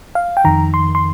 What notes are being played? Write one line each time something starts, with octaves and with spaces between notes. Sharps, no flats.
F5
G5
F2 D#3 A#5
C6
C6